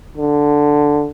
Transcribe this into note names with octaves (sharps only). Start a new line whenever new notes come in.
D3